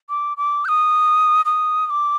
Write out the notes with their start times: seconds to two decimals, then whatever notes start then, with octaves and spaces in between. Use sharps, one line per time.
0.09 D6
0.37 D6
0.65 G6
0.68 D#6
1.45 D#6
1.87 D#6
1.90 D6